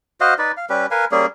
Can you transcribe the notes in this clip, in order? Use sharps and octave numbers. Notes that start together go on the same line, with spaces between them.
F#4 C5 D#5 F5
D#4 B4 D5
F5
G3 C#4 G4 B4
A#4 B4 F5 G#5
G3 A#3 C#4 G#4